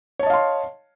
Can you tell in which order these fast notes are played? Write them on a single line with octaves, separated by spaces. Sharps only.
C#5 A5 D#5 F5 C6